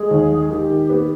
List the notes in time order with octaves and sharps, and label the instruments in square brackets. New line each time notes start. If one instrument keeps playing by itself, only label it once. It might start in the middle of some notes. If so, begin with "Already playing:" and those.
Already playing: [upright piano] G#3 [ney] G#4
[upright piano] D#2
G#3
[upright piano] D#3 [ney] G4
[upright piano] D#3
B3